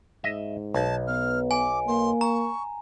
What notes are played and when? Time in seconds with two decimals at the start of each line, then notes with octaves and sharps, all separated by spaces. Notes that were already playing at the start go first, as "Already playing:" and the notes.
0.24 G#2 D#5 E5
0.74 B1 A5
1.08 B3 F6
1.51 G#5 D6
1.88 A#3 C6
2.21 A#5 C#6